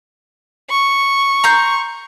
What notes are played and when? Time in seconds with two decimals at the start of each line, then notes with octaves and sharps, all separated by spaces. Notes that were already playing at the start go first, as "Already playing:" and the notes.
0.70 C#6
1.44 A#5 C6 G6